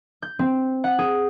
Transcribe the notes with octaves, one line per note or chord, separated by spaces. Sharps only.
G6
C4
F#5
G#4